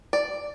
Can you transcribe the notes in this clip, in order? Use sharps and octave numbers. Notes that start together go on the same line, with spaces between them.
D5